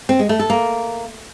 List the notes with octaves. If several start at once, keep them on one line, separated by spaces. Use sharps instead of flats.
C4
G#3
A3
A4
A#3